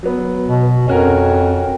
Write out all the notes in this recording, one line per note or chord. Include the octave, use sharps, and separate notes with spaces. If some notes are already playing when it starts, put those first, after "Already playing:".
F#3 B3
B2
F2 C#4 F#4 A#4